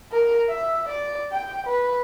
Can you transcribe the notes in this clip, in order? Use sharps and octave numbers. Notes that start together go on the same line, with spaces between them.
A#4
E5
D5
G5
B4